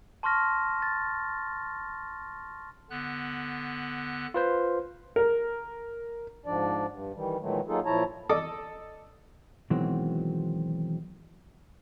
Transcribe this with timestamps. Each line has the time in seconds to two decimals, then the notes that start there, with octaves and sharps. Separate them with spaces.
0.23 A5 C6 C#6 F6 A#6
0.82 A6
2.90 D3 B3 F#6
4.34 F4 B4 C5
5.16 A#4
6.46 G#2 F3 D4 D5
6.90 G2
7.14 D#3 E3 G3
7.41 A#2 D#3 E3 F#3 G#3 A3
7.68 F#3 A#3 D#4 F4 G#4 A4
7.85 A#2 F3 E4 C#5 A5 A#5
8.29 A4 D5 D#5 D6 D#6
9.70 B2 D#3 E3 F#3 G#3 C4